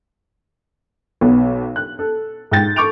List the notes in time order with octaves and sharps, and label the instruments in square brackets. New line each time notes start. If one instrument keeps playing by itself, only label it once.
[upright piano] B1 B3
F#6
A4
G#2 G5 G6 A6
A4 C#6 D6 G6 D7 F7